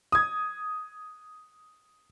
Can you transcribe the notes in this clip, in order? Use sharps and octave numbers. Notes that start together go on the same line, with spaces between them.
D#6 G#6